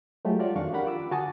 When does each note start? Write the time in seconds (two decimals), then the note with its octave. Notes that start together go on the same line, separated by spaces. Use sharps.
0.25 F#3 G#3 A3 F4 G4
0.39 F4 F#4 A4 C#5 D5
0.56 F2 D#3 D4 F5 C#6
0.72 C#4 G4 A#4 F5 F#5 B5
0.86 F4 D6 E6
1.11 D3 F#4 G#5 A5 C#6 D#6